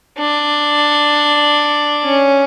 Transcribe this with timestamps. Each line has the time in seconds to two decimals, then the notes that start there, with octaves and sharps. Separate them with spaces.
0.18 D4
2.04 C#4